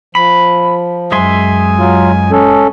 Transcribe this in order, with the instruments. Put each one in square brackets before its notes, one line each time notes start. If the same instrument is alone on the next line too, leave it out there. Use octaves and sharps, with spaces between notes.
[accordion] F3 [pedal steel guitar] B5
[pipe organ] F#2 G#5 [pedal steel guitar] G#3 E5 C6
[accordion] F#3 F4
C#4 A4